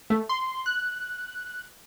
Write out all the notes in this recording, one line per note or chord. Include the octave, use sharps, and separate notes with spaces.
A3
C6
F#6